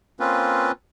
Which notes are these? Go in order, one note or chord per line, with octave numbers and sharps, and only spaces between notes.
A#3 C4 C#4 F4 B4